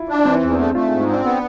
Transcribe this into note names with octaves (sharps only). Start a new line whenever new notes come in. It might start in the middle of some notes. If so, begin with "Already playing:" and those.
Already playing: E4 F4
D4
E3 C4
E2
D4
A3
A3 F4
G#2 G#4
F4
C4 D4
B3